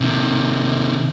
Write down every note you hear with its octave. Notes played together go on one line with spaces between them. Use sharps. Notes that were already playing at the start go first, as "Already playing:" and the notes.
C3 D#3